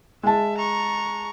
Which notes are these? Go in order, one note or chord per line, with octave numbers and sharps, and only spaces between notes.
G#3 E5 A5
A#5 C#6